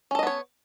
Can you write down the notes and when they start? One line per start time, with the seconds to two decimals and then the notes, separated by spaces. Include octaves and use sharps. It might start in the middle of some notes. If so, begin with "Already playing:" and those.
0.11 C#4
0.15 A4
0.19 D#5
0.23 B3
0.27 C#5